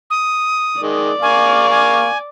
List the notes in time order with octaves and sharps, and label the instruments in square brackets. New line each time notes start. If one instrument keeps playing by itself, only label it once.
[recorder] D#6
[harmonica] D#3 G#3 [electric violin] D5
[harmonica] A#3 F5 C#6 [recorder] G#5
[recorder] G#5